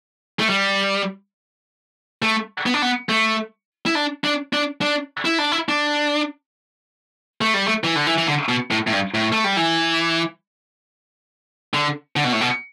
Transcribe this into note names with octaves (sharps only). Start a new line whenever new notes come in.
A3
G3
A3
B3
D4
B3
A3
E4
D4
D4
D4
D4
E4
D4
E4
D4
A3
G3
A3
E3
D3
E3
E3
D3
B2
A2
A2
G2
A2
A3
G3
E3
D3
D3
B2
A2
B2